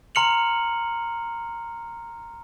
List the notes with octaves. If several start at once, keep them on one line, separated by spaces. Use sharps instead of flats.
A#5 C6 F6 C#7 F7 F#7